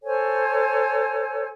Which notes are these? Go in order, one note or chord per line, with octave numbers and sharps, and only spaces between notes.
A4 C5 C#5 G#5